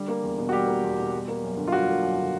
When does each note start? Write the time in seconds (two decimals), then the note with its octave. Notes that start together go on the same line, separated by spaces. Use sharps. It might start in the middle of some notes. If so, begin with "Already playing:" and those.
Already playing: D3 G3
0.08 A#3
0.23 E2
0.38 B2
0.49 F#4
0.52 G3 G4
0.67 A#3
0.84 E2
0.97 B2
1.12 G3
1.28 A#3
1.43 F#2
1.57 D3
1.67 F4
1.72 G3 F#4
1.88 A#3
2.03 F#2
2.18 D3